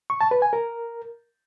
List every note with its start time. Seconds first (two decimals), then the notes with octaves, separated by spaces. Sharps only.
0.10 C#6
0.21 A5
0.31 B4
0.42 G#5
0.53 A#4